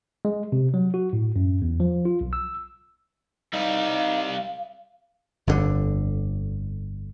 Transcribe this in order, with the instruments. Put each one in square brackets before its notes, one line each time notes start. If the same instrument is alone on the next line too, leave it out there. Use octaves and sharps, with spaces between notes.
[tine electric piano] G#3
C3
F#3
F#4
A2
F#2
E2
F3
F4
B1
E6
[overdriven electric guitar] C2 G3 [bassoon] D#4 [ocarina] F5
[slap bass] G1 F2 B2 D3